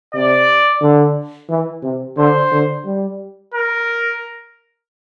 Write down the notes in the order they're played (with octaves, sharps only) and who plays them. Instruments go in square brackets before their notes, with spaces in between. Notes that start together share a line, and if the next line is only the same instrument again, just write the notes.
[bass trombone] C3 [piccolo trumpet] D5
[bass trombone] D3
E3
C3
[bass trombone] D3 [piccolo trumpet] C5
[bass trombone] D3
G3
[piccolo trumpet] A#4